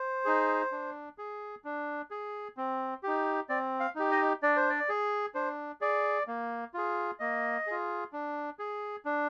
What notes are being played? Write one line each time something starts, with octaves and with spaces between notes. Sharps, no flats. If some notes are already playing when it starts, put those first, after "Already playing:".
Already playing: C5
D#4 G#4
D4
G#4
D4
G#4
C4
D#4 G4
C4 D5
F5
D#4 G4
D#5
D4 D5
C5
D5
G#4
D4 C5
G#4 D5
A#3
F4 G#4
A#3 D#5
F4 G#4
D4
G#4
D4